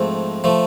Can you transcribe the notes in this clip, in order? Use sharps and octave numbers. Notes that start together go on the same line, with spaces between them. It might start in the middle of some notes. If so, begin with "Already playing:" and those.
Already playing: G#2 F3 A3 C4
F3 A3